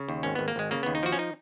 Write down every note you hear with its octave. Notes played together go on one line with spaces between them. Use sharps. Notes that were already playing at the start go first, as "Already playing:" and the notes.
Already playing: C#3
D#2
G#1 C#4
G#1 B3
A#3
G#1 G#3
C#3 A#3
D#2 B3
D#4
F3 F#4
C#4
D#4